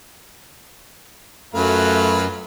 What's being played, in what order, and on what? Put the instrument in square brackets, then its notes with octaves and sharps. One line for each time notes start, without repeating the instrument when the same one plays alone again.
[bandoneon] F#2 [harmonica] F#3 F4 B4 [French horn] A3